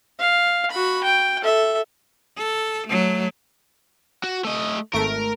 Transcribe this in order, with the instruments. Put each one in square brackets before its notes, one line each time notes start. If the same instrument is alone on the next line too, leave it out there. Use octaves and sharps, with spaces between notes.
[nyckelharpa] F5
F#4 B5
G5
A4 E5
[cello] A4
F#3 A3
[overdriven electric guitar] F#4
A3 D#5
[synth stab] G#1 A3 D7 [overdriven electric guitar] A#4